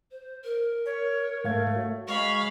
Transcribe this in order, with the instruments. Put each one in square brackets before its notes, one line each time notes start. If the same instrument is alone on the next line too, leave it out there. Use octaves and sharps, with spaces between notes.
[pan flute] C5
A#4
[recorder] C#5
[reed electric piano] G#2 F5 G#6 [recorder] A3
[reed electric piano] F#4 C#5
[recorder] G#3 [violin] F5 B5 [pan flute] C#6